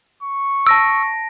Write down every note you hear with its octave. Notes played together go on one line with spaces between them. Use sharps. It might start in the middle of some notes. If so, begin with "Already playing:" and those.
C#6
A5 E6 A#6 D7